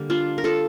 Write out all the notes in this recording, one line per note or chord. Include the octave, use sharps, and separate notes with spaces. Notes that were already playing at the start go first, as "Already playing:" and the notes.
Already playing: D3 G3 A#3
D4 F4
A#4
F4 A4